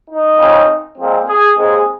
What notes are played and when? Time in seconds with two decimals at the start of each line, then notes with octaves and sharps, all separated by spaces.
0.09 D#4
0.38 F2 C#3 G#3 C4
0.98 A#2 F3 G#3 C4
1.28 G#4
1.57 D#2 D#3 G#3 C4 G#4